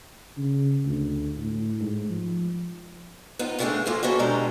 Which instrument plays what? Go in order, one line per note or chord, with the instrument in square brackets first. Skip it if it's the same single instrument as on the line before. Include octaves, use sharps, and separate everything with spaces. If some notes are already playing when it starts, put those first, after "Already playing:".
[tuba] C#3
D2
A2
G#2
F3
[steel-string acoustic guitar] B3 D#4 F4
C#3 G#3 A3 C#4 D4 G#4
A#3 F4 G#4 A4
B3 C#4 D#4 F#4 A4
B2 D3 G3 G#3 A4 A#5